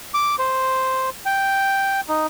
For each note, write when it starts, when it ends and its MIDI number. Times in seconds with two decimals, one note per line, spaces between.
0.14 0.36 86
0.39 1.10 72
1.26 2.01 79
2.08 2.27 63